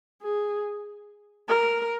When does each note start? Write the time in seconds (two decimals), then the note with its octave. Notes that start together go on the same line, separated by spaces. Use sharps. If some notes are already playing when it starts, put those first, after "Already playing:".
0.22 G#4
1.48 A#4